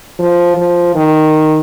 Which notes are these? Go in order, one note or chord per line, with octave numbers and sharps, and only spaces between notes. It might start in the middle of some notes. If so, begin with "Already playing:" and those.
F3
F3
D#3